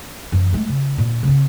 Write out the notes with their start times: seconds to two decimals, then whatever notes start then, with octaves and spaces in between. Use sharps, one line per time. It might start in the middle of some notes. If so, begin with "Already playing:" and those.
0.32 F#2 E3
0.53 G#3 A3
0.68 C#3
0.96 D2 A#2
1.23 C#3 C4